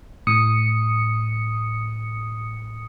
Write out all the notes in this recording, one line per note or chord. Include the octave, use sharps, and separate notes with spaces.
A2 D#6 C#7